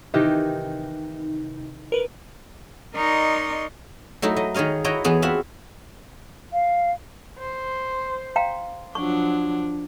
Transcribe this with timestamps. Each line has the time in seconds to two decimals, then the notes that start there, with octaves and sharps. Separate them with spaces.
0.14 C3 D#3 E3 D#4 G4
1.92 A#4 B4
2.95 D#4 A#4 D5 D#5 C6 C#6
4.22 F#3 A3 D#4 E4
4.36 F#3 D#5
4.54 D#3 G#4 C#5 D#5 F5
4.84 E4 F#4 C#5 D#5 G5 A#5
5.04 E2 E3 B3 G#4 C#5
5.22 C4 F4 F#4 E5 F#5 B5
6.53 F5
7.39 C5
8.36 F5 G5 A#5
8.95 F3 F#3 D4 C#6